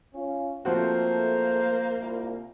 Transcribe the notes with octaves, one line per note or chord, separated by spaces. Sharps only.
C#4 F4
F3 A3 A#3 C4 F#4 C5
C2 E4 F4